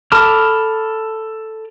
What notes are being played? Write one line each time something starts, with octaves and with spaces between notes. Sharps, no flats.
A4 A5 B5 D6 F6